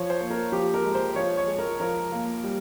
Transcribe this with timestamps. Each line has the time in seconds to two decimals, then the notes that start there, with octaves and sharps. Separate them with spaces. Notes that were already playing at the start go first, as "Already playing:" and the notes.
Already playing: F3 C#5
0.10 C5
0.21 A#3
0.30 A#4
0.52 F3 G4
0.74 A#4
0.84 G#3
0.95 C5
1.16 F3 C#5
1.37 C#5
1.48 G#3
1.59 A#4
1.80 F3 A#4
2.12 A#3
2.44 G3